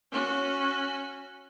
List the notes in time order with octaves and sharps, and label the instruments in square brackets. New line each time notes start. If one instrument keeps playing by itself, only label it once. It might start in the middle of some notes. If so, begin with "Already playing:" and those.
[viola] C#4 F#4